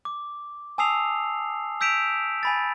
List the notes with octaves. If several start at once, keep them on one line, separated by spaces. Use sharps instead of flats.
D6
G#5 A5 D#6 E6 C7 F7
E6 G6 B6 D7 E7 F7
G#5 B5 A6